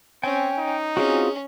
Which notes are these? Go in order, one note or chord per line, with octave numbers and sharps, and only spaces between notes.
C4 C#4 G5 G#5
D#4
C4 C#4 F4 F#4 G#4